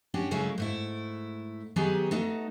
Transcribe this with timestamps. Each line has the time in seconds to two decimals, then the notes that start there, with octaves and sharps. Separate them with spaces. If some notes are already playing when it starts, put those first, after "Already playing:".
0.14 C#4 D4 F#4 G4
0.31 C#3 F#3 G#3 A3 C#4 E4
0.58 G#2 A3 E4
1.76 D#3 F#3 B3 D#4 G4 G#4
2.11 A3 B3 D#4 F#4